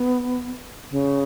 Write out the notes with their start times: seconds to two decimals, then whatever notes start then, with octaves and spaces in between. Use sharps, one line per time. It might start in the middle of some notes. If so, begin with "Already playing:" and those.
Already playing: B3
0.91 C#3